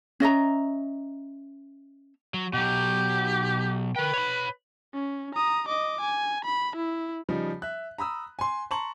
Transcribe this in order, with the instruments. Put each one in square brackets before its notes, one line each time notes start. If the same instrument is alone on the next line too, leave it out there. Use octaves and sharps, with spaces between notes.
[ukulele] C#4 D#5 E5 A#5
[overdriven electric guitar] F#3
[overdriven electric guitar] B2 F#3 [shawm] G4
[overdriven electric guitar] A#4 G5 [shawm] B4
[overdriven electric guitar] C#5 B5
[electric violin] C#4
A#5 D#6
D#5 D6
G#5
B5
E4
[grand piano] C#3 F3 G3 D#4
E5 F#6
A#5 B5 D#6 E6
G#5 C6
A5 A#5 C6 C#6 F#7